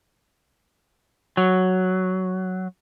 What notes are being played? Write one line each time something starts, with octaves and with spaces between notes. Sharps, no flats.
F#3